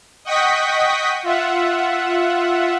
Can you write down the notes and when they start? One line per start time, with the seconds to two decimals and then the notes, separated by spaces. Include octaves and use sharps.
0.25 D#5 F#5 G5 C#6 D#6 B6
1.23 F4 E5 F#5